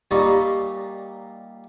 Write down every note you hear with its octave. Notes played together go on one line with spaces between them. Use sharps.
A#2 G3 D#4 C#6